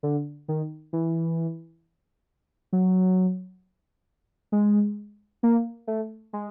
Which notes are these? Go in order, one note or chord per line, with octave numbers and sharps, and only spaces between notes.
D3
D#3
E3
F#3
G#3
A#3
A3
G#3